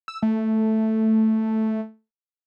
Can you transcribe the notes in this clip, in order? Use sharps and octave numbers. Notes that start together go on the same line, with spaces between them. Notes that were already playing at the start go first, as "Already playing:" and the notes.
E6
A3